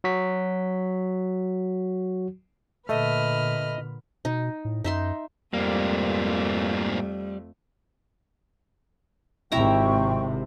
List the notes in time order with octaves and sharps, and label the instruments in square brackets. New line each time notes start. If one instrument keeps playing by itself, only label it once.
[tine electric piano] F#3 F#4 B6
[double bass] A#2 D3 [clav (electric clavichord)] A3 [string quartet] B4 B5 F6 [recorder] D#5
[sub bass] B2 [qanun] D#4
[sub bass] A2
[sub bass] F#2 [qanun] D#4 E5 C6
[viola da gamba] F2 A3 [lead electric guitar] G#2 A#3 [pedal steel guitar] G3
[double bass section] G#1 C3 [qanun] E4 E5 A#5 [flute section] G5 C#6